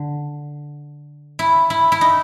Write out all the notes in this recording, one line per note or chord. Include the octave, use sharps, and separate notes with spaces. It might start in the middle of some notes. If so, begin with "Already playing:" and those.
Already playing: D3
E4
E4
E4
D#4